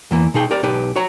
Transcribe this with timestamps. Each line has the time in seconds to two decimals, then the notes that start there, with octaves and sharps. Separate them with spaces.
0.11 E2 E3 A#3
0.34 B2 D#4 G#4 G5
0.51 G4 A#4 D5
0.63 B1 D#4 G4 B4
0.96 F#4 C#5 A#5